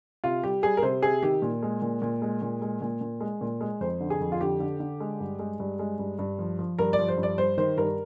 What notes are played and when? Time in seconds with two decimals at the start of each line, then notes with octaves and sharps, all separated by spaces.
0.24 C3 F4
0.43 G3 G4
0.62 G3 G#4
0.77 A#4
0.83 C3 C5
1.02 C3 G#4
1.23 D#3 G4
1.42 A#2
1.63 G#3
1.82 A#2
2.02 A#2
2.22 G#3
2.42 A#2
2.62 G#3
2.81 A#2
3.01 A#2
3.20 G#3
3.41 A#2
3.61 G#3
3.80 F2 C5
4.01 D3
4.10 G#4
4.20 F2
4.32 F4
4.40 D3 G4
4.60 D3
4.80 D3
5.00 G#3
5.20 G2
5.39 G#3
5.60 G2
5.79 G#3
5.99 G2
6.19 G2
6.39 F3
6.59 F3
6.78 G2 A#4
6.93 D5
6.99 F3
7.08 C5
7.18 G2
7.23 D5
7.38 G3 C5
7.58 D#3 C5
7.77 G2 A#4